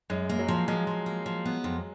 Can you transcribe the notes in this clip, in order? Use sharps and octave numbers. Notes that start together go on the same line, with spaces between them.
F#2 G#3
A#3
F#3
F3
F3 G#3
F3
A#3
F3
B3
F2